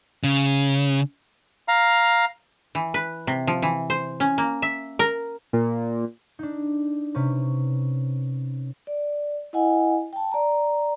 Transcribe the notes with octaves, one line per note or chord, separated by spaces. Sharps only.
C#3
F5 A#5
E3
B4
C3
F3
E3
C5
C#4
A#3
E5
A#4
A#2
D4 D#4
C3 C#4 B4
D5
E4 D#5 F#5 G#5
G5 A5
D5 A#5